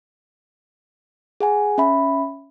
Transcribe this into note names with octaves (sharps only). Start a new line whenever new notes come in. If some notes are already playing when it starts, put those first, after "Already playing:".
G#4 F#5 G#5
C#4 E5 B5